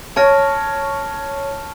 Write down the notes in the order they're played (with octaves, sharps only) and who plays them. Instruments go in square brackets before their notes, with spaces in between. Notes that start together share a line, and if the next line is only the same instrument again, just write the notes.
[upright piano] C#5 [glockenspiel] A5 C#6 F6 A#6 D7